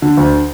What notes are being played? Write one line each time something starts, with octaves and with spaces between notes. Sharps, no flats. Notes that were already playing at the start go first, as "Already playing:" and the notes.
D3
D2